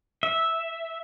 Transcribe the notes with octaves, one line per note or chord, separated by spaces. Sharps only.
E5